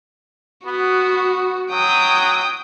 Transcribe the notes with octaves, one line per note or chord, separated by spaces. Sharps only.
B3 F#4
F#3 G5 D#6